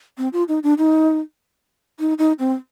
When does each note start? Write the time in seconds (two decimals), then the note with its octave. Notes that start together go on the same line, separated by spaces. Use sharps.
0.18 C4
0.33 F4
0.48 D#4
0.63 D4
0.78 D#4
1.99 D#4
2.18 D#4
2.39 C4